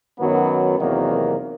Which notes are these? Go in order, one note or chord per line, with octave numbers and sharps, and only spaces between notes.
F#2 D#3 F#3 B3
E2 C3 D#3 F#3 A#3